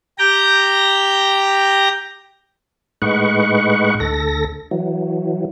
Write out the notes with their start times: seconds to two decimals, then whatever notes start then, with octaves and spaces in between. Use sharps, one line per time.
0.19 G4 G5 A#5 G6 A#6
3.02 A2 G#3 D#4 B4 F#5 C#6
4.00 D2 A4 A#6
4.71 E3 F#3